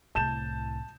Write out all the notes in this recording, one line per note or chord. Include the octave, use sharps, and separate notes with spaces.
C2 A2 A5 G6 E7